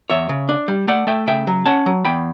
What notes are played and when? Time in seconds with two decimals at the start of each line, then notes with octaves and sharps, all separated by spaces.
0.10 E2 C#5 E5
0.29 C#3
0.49 D4
0.68 G3
0.88 A3 D5 F#5
1.07 A3 E5 G5
1.27 C#3 E5 G5
1.47 F#3
1.66 C#4 F#5 A5
1.86 F#3
2.05 E2 G5 B5